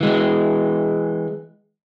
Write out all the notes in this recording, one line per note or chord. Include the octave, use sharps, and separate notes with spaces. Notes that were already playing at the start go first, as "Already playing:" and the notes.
E3 G#3